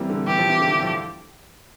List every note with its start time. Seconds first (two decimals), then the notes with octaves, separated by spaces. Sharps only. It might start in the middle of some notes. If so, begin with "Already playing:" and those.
Already playing: E3 G3 A#3 C4
0.10 D3
0.27 E3 G4
0.39 F3
0.50 E3
0.60 D3
0.72 E3
0.83 F3